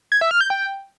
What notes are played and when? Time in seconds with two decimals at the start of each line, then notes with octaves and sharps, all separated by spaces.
0.12 G#6
0.21 E5
0.31 F6
0.41 G6
0.50 G5